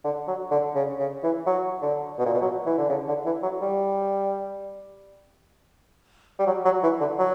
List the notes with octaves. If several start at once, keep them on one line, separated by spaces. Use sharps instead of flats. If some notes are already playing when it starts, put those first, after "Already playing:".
D3
F#3
D3
C#3
C#3
E3
F#3
D3
B2
A#2
B2
F#3
E3
D3
C#3
D3
E3
F#3
G3
G3
F#3
F#3
E3
D3
F#3